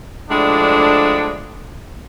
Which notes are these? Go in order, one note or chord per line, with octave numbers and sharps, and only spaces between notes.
A2 F3 G#3 D4